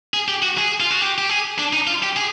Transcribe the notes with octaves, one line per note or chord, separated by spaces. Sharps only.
G#4
G4
F#4
G#4
F4
F#4
G4
G4
G#4
D4
D#4
F4
G4
G#4